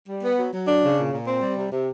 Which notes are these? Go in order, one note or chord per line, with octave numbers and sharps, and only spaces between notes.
G3
B3
F#3
F#3
D4
C#3
A#2
A#2
C4
G3
C3
C3